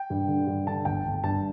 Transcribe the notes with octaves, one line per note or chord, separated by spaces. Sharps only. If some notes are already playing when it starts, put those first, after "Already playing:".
Already playing: G5
G2
D3
G2
D3 A5
G1 G5
G1
G2 A5